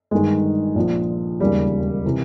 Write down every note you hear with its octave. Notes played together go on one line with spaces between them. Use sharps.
G1 G2 D#3 G#3
A#1 A#2 F3
E1 D#2 C#3 G3
C3 E3